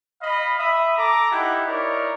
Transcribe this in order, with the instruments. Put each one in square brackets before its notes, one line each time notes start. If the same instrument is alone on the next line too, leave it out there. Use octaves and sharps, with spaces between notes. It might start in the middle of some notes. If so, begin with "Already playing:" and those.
[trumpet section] D#5 F5 B5
E5 B5 D#6
A4 A#5 D6
D#4 E4 G4 F#5
D#4 E4 A#4 C#5 D5